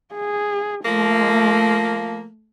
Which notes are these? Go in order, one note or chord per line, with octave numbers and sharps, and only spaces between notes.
G#4
F3 A3 A#3